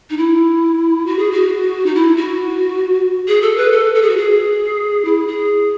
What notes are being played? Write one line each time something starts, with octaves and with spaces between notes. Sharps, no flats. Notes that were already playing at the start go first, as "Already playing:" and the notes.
D#4
E4
F#4
G#4
F#4
D#4
E4
F#4
G#4
A4
B4
A4
A4
G#4
F#4
G#4
E4
G#4